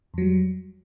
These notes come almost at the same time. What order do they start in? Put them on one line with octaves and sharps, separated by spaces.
F2 F#3 G3